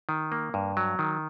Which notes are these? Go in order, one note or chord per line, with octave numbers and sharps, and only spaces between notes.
D#3
A#3
G2
F#3
D#3